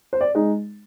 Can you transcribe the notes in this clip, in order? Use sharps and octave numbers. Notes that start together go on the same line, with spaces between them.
C5
D5
G#3 D#4